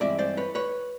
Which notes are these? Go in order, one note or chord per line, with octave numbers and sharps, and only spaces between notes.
G2 E3 G#3 C4 D5 E5
C5 D5
B4 C#5
B4 C#5